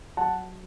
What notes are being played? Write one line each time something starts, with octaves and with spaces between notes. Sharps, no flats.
F#3 F#5 A5